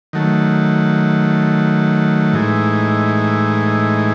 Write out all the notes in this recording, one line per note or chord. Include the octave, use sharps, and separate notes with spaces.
D#3 F#3 A3
A2 E3 G#3 D#4